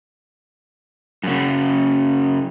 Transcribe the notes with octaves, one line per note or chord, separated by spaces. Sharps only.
F#2 C#3